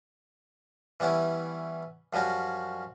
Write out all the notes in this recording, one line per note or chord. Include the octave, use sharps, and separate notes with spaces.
E3 G3 B3 C#4 E4
F#2 F3 G3 C#4 F#4